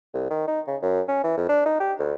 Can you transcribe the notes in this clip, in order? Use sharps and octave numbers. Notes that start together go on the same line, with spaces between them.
C2
D#3
D#4
C#3
F#2
C#4
E3
F2
D4
D#4
G4
D2